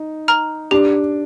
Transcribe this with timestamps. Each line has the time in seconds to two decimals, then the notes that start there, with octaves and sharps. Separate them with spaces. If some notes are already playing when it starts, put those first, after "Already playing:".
Already playing: D#4
0.28 A#5 F6
0.71 D4 G4